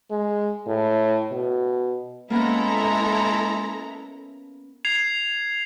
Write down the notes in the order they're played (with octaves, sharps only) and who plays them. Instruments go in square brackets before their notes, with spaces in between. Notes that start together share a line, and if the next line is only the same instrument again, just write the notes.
[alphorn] G#3
A2
B2
[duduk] G#3 [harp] A#3 B3 C#4 [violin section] E4 A4 A#5
[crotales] G#6 C7 F7